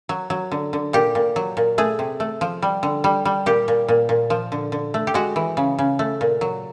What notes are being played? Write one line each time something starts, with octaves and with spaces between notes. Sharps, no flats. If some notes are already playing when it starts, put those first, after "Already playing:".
F#3
F#3
D3
D3
A#2 G4
A#2
F#3
A#2
A3 G#4
C3
A3
F3
G3
D3
G3
G3
A#2 G4
A#2
A#2
A#2
F3
D3
D3
A3
G4
G#3 F#4
E3
C#3
C#3
A3
A#2
F#3